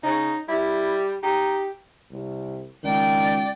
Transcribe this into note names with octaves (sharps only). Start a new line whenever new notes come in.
C#3 D#4
G3 E4
D#4 G4
C2
C#2 D#3 D5 G5